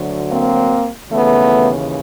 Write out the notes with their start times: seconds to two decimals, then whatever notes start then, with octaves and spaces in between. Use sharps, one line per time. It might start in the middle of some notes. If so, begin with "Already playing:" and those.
Already playing: D2 D3 F#3
0.31 A#3 C4
1.11 D#2 C#3 E3 A3 B3